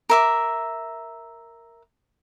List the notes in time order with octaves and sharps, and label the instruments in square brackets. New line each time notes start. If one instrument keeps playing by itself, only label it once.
[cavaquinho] A#4 E5 D6